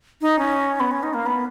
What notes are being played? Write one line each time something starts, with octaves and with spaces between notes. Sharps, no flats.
D#4
C#4
B3
C#4
D#4
A#3
B3